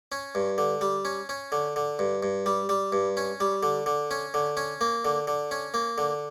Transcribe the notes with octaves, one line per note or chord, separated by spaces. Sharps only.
C#4
G2
D3
G3
C#4
C#4
D3
D3
G2
G2
G3
G3
G2
C#4
G3
D3
D3
C#4
D3
C#4
A#3
D3
D3
C#4
A#3
D3